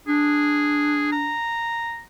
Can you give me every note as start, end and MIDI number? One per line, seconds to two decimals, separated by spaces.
0.07 1.35 62
0.07 1.08 68
1.12 2.01 82